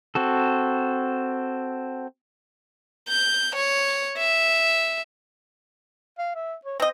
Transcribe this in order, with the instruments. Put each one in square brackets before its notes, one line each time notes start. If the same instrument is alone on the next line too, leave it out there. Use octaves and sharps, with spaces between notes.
[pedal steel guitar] C4 F#4 A4
[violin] G6
C#5
E5
[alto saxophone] F5
E5
C#5
[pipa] C4 D#5 [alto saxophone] C5